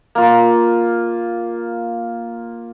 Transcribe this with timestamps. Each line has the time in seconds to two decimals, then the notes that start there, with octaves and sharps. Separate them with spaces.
0.15 A#3 F4